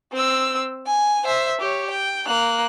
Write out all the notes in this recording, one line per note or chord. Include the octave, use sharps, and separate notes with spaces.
C4 E6
G#5
C5 E5
G4 C#5
G5
A#3 F#6